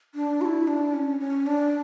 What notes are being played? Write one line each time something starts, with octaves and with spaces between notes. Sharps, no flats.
D4
F#4
E4
D4
C#4
C#4
D4